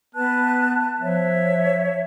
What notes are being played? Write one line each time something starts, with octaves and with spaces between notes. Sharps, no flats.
B3 B4 A5 F#6
F3 C#5 E5